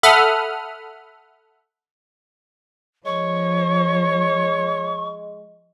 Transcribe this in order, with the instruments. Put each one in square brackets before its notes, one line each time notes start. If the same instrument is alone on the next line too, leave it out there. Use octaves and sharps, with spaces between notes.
[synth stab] A4 E5 F#5 B5 D#6 F6
[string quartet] F3 [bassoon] G#3 [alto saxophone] C#5 [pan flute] C#6